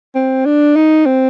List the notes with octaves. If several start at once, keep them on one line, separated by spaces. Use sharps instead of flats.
C4
D4
D#4
C4